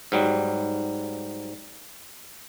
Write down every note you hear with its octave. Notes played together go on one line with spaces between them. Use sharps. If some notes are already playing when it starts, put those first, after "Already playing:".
G#2 F#3 G3